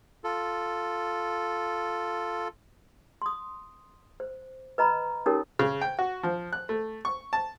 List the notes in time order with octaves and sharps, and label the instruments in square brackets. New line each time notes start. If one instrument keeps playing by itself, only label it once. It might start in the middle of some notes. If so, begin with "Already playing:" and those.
[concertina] F4 A4
[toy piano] C6 D#6
C5
B4 D#5 A#5 B5
C#4 D#4 G4 A4 A#4 C#5
[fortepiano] C#3
G5
F#4
F3
F#6
A3
C#6
A5